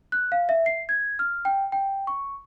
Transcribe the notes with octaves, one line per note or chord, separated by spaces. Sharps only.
F#6
F5
E5
C7
G#6
F6
G5
G5
C#6